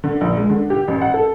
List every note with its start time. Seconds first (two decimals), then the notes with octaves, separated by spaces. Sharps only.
0.04 D3
0.21 A#1
0.37 G#3
0.49 D3
0.70 G4
0.88 A1
1.01 F#5
1.14 A4